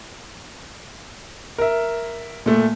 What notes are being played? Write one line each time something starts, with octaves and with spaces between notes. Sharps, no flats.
A#4 E5
A#2 A3